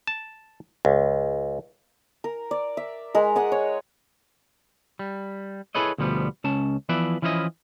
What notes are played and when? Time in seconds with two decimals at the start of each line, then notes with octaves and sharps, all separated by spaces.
0.07 A5
0.85 C#2
2.24 A#4
2.51 D5
2.77 E5
3.14 G#3 A#4
3.36 G#3 D#5 F#5
3.52 C#5
4.99 G3
5.75 E4 G#4 A4 B4 C#5 D#5
5.98 D2 B2 F3 G3 B3
6.44 C#2 C#4 A5
6.89 E3 F3 B3 B4 D5 E5
7.22 E3 F3 C#4 E4 G4 D#5